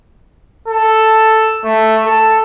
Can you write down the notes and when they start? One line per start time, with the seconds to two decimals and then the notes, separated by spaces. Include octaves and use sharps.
0.68 A4
1.64 A3
2.06 A4